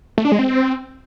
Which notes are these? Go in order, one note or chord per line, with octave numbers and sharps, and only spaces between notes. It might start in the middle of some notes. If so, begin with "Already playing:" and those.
A3
D4
G#3
C4